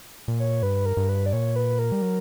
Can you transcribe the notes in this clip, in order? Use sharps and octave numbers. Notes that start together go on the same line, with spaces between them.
A#2
C#5
G2 B4
A#4
G2
B4
D5
A#2 C#5
B4
A#4
G3
F#3